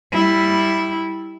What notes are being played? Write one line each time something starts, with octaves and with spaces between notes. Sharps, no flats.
G3 E4